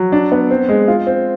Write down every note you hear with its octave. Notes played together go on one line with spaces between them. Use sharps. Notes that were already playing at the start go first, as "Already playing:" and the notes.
Already playing: F#3
D4
B3
C4
G#3
F4
C4